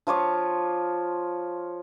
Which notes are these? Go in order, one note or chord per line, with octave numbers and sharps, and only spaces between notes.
F3 F4 C#5 D6